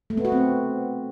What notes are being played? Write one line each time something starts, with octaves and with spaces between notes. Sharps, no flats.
A3
B3
F#4
C4